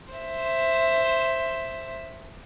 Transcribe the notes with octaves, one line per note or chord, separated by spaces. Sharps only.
C5 E5